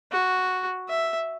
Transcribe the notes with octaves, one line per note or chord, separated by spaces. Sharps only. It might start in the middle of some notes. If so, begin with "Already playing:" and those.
F#4
E5